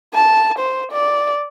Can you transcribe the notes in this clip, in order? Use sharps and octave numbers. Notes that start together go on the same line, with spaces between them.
A5
C5
D5